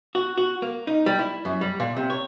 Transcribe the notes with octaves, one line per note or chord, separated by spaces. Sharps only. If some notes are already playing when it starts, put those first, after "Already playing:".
F#4
F#4
A#3
D#4
G3
E4
F#2
G3
A#2
C3
C#5